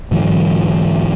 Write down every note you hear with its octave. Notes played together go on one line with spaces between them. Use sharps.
G#2 D3 E3 F#3